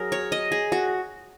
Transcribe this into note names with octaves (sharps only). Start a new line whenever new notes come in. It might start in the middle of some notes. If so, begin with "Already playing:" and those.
Already playing: F#3 G#4 A#4
C#5
D#5
G#4
F#4